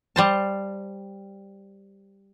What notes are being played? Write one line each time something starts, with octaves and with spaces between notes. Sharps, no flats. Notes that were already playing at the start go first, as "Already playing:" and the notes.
G3 C5 A5